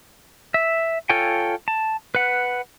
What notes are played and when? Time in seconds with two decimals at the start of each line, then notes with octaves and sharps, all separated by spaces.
0.54 E5
1.09 F4 A4 C#5 G5 G#5
1.68 A5
2.15 B4 F#5